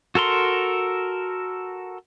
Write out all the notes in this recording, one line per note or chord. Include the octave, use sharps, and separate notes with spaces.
F#4 A4 A#4 C6